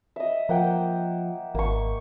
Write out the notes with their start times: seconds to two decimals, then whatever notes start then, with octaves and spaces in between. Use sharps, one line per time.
0.16 D#5 E5
0.49 F3 A#3 F#5 G5
1.55 G#1 A#3 C#6